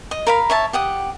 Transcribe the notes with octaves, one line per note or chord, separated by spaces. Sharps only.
D#5
A#4 F5 B5
C#5 E5 A5
G4 F#5 D#6